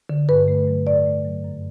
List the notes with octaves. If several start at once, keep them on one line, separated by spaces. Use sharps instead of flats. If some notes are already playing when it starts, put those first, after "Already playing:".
D3
G2 B4
A3
F#3
A2 D5
A3
F#3
F#2